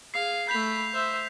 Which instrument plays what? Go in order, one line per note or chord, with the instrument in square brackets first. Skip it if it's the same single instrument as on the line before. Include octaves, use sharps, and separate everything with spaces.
[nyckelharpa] G#4 F5 [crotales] C7
[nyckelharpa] A3 B5 [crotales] G6 B6 F7
[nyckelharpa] C5 E5